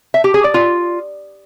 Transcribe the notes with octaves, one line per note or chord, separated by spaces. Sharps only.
E5
G4
G#4
D5
F4